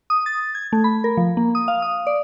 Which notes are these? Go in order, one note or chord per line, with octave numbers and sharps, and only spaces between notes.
D#6
A6
G#6
A3
B5
A#4
F3
A#3
D#6
F5
D#6
D5